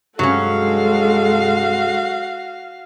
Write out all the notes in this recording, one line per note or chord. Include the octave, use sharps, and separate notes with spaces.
G2 C3 F#3 G#3 C#4 F#4 A4 F5